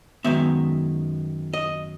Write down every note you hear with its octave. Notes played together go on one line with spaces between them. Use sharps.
F#2 D#3 G#3 B3 E5
D#5